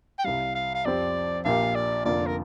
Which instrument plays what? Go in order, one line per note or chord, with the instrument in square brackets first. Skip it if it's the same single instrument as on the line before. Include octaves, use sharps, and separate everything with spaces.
[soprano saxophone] G5
[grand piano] C2 C3 G3 [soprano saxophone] F5
[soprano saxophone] F5
F5
[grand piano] F2 F3 C4 G4 C5 [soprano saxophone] D5
[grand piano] A#1 A#2 A#3 G4 [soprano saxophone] F5
[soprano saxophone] D5
[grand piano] F1 F2 D3 A#3 F4 [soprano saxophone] D5
[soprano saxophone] A#4